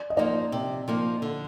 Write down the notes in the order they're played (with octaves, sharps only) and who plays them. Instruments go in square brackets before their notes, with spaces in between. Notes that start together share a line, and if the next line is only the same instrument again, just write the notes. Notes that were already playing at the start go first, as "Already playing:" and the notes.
Already playing: [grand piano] D5
D#5
[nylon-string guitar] F3 A#3 D#4 [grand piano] D5
[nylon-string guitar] C3
F3 A#3 D#4
D3